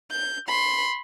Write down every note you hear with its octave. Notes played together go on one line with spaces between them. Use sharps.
G6
B5 C6